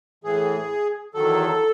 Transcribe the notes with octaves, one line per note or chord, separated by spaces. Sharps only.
A2 E3 G#4
E2 D#3 F#3 A4